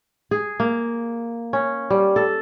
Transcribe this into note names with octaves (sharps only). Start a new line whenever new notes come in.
G#4
A#3
C#4
G3
A4